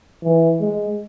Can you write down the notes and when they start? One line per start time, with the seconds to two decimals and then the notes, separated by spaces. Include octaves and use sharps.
0.24 E3
0.61 G#3